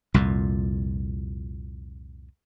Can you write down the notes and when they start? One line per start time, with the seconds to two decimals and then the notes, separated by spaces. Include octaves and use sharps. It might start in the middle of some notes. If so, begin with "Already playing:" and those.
0.14 C2 F2 A#2